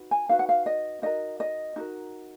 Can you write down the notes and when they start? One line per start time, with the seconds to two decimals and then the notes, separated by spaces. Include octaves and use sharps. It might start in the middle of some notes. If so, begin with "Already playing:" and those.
Already playing: D#4 F#4 B4
0.11 G#5
0.29 D#4 F#4 B4 F5
0.39 F#5
0.49 F5
0.66 D#5
1.02 D#4 F#4 A#4 D#5
1.40 D#5
1.76 D#4 F#4 A#4